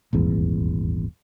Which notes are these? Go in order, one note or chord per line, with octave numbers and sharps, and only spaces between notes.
D#1 G#1 E2